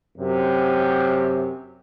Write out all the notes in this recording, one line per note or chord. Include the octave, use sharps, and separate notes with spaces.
F#2 C3